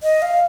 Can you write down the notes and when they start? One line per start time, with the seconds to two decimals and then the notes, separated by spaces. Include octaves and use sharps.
0.03 D#5
0.22 F5